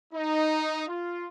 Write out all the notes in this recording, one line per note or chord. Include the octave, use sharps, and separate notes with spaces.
D#4
F4